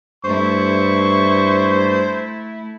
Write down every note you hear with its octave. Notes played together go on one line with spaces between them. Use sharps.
G2 A3 E4 C5 C#6